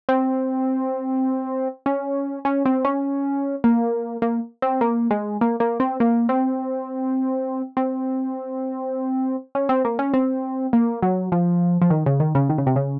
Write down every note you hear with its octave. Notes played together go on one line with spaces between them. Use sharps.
C4
C#4
C#4
C4
C#4
A#3
A#3
C4
A#3
G#3
A#3
A#3
C4
A#3
C4
C4
C#4
C4
A#3
C#4
C4
A#3
F#3
F3
F3
D#3
C#3
D#3
C#3
D#3
C#3
C3
C#3